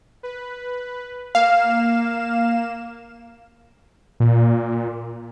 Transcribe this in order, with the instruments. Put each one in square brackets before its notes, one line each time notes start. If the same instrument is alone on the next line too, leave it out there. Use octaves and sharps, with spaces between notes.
[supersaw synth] B4
[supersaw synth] A#3 E7 [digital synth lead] F5
[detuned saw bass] A#2